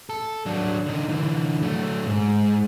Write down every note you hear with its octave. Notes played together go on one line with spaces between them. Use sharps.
A4
F#3 D4
D3 D#4
D3 E3
F#3 A3
G#2